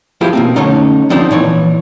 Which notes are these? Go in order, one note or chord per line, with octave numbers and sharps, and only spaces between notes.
F3 E4 F4 G4 G#4 C5
B2 A#3 C4
D3 A3 C#4 D#4
F3 C4 D4 D#4
A#2 E3 C#5